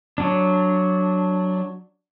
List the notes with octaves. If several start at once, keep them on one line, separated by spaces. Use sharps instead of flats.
F#3 D4